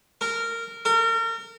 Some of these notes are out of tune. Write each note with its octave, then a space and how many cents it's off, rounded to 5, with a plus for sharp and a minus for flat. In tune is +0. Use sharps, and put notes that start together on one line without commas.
A#4 -15
A#4 -35